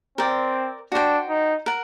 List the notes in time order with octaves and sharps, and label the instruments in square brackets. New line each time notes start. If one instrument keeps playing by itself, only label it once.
[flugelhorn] C4 [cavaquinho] A#4 D5 G5
[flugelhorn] D4 [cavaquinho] F#4 C5 G5
[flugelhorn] D#4
[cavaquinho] A#4 F#5